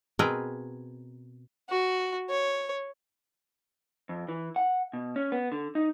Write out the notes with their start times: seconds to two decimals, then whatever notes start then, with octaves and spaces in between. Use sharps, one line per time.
0.19 B2 C4 G#4 A#4 B4 A#5
1.69 F#4
2.29 C#5
4.09 F2
4.29 E3
4.56 F#5
4.93 B2
5.16 C#4
5.32 B3
5.52 D3
5.75 D#4